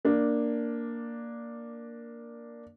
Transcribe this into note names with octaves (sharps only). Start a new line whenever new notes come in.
A#3 D4